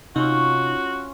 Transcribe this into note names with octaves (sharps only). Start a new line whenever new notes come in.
C3 C#4 D#4 F4 F#4 C#5